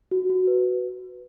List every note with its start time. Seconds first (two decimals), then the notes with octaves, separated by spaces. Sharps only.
0.11 F#4
0.30 F#4
0.47 B4